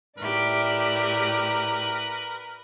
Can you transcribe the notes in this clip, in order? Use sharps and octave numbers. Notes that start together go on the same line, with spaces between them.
A2 G4 A#4 B4 D5 E5